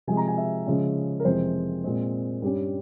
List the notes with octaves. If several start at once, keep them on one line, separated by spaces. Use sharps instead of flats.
C3 F3 G#3 G#5
A#5
G#5
E5
C#3 F3 G#3 C#4
A#4
F2 C3 E3 G#3 C5
A#2 G#3 C4
G2 G3 C#4